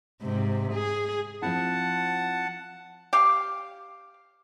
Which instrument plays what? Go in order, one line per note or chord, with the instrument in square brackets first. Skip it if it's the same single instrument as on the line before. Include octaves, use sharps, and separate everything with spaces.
[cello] G#2 C3
G#4
[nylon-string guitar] F3 C4 E4 [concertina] F#5 A5
[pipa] G4 F5